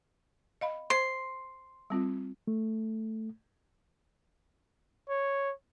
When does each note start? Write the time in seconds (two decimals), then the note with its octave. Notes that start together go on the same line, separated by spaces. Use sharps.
0.61 D#5 F5 B5
0.90 C5 C6
1.90 G3 C4 F4
2.47 A3
5.09 C#5